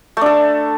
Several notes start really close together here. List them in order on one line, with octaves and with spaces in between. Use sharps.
A3 D4 A4